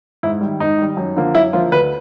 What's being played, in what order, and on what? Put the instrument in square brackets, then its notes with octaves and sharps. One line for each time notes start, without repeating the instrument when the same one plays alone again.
[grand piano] G#2 E4
D#3 G3
G#2 D#4
D#3 G3
F#2
D3 F3 A#3
F#2 E4
D3 F3 A#3 F4
D2 B4